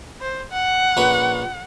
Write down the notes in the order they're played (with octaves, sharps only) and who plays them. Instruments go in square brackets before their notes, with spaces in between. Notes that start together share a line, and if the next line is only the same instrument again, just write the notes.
[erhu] C5
F#5
[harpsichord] A#1 C#4 B4